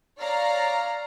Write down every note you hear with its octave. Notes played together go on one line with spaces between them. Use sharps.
C#5 D5 F5 A#5